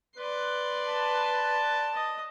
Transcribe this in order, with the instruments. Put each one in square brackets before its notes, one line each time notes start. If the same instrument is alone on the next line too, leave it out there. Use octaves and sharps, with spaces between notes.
[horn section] B4 [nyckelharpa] D5 C6
[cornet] A5
[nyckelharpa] D#5